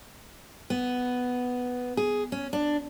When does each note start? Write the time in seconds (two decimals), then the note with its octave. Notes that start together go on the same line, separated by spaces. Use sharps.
0.70 B3
1.97 G#4
2.32 C#4
2.53 D4